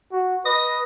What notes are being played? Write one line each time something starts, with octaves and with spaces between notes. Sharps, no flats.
F#4
B4 D#5